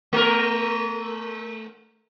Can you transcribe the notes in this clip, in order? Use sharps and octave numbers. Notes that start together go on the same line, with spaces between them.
A3 A#4